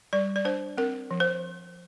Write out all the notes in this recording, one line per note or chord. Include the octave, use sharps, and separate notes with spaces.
G3 D5
D5
D4 C5
C4 A#4
F3
C5